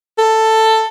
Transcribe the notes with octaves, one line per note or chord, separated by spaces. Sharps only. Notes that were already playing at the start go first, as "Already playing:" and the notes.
A4